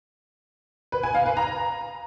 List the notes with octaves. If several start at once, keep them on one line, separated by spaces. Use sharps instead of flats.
B4
G#5
F5
B4
A#5